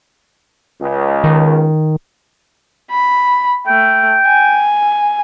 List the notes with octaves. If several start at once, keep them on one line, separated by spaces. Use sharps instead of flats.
C#2
D#3
B5
A3 G5
G#5